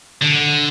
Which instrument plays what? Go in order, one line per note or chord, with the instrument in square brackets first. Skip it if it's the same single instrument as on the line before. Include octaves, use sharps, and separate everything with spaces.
[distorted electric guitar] D3